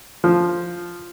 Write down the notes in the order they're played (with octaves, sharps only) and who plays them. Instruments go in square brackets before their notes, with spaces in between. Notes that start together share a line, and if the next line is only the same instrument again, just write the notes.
[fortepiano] F3